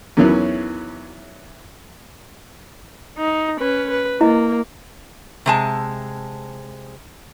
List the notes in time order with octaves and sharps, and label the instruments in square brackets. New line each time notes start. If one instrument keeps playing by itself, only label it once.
[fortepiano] E2 D#3 E3 F#3 C#4
[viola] D#4
C#4 B4
B4
[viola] A#3 [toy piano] E4 D#5
[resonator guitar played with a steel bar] C3 G#3 A5